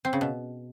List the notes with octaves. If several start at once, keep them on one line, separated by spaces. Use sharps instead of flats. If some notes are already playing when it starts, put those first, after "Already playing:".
C4
C#3
B2